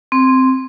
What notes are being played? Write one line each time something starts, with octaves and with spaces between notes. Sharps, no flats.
C4